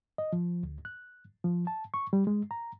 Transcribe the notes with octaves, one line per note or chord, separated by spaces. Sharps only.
D#5
F3
D2
F#6
F3
A5
C#6
G3
G#3
A#5